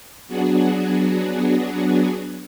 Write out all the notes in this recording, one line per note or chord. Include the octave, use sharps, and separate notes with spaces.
F#3 B3 D4 F#4 G#4